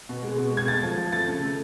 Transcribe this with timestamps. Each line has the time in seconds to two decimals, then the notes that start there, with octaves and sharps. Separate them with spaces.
0.09 B2
0.23 G#3
0.38 B2
0.53 G#3 G#6
0.68 A3 A6
0.83 F3
0.97 F3
1.12 A3 A6
1.27 C#3
1.42 A3